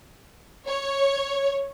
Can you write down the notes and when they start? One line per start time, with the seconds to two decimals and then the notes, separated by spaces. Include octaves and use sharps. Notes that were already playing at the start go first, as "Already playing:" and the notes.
0.67 C#5